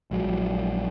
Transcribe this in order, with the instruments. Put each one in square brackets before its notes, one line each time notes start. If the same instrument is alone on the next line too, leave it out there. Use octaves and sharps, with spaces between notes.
[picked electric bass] A#1 F#3 G#3